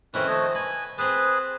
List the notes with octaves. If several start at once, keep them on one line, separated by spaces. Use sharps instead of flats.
F2 D#3 C4 C#4 E4 B4
A3 C#5 D#5
B4 G#5
C4 G#4 A4 B4